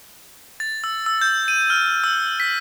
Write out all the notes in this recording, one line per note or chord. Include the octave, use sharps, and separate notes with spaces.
A6
E6
E6
G6
D#7
F6
E6
B6